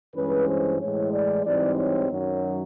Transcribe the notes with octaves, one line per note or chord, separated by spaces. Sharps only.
G2 E3 G#3 C#4 B4
C5
A2 E3 G#3 C#5
D5
G#2 E3 G3 C4 D#4 D5
C#5
F#2 D#3 F#3